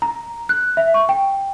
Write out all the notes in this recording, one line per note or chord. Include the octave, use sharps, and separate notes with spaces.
A#5
F#6
E5
C#6
G5